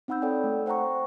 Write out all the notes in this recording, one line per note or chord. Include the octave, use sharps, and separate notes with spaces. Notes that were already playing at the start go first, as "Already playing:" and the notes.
C4 D#4 F#5 B5 E6 G6
A4 C#5 D5 G5
A3
C5 F#5 G5 A#5 C#6